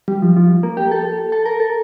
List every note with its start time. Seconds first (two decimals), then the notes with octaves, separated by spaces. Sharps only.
0.08 G3
0.22 F3
0.36 F3
0.63 A#3
0.77 G4
0.92 A4
1.32 A4
1.46 A#4
1.60 A4